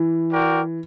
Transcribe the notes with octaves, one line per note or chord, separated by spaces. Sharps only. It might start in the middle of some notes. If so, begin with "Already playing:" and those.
Already playing: E3
F#4 A#4 D5 G5